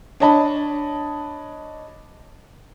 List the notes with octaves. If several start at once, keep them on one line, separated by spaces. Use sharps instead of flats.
D4 C#5 D#5 A5 B5